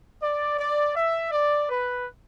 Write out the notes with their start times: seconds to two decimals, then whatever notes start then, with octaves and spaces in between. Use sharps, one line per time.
0.22 D5
0.59 D5
0.95 E5
1.31 D5
1.68 B4